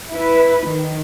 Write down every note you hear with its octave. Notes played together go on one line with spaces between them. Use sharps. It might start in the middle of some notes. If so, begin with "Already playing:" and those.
E4 B4
D#3